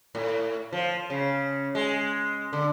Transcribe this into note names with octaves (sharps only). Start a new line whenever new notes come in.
A2
F3
C#3
G#3
D3